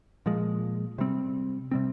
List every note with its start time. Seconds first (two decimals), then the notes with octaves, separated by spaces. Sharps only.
0.26 A#2 F3 G#3
0.98 C3 G3 C4
1.71 C3 G3 C4